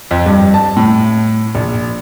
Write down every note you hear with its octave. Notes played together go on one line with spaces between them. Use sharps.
F2
G2
A5
A2
A#1